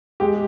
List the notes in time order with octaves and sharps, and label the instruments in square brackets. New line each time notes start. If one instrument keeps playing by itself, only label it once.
[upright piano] G#3 G4